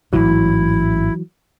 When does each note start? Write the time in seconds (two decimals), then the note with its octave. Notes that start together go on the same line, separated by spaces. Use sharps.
0.13 A1 G#2 E3 F#3 E4